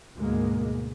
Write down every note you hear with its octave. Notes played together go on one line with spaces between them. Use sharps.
D2 G#2 B2 G#3 A#3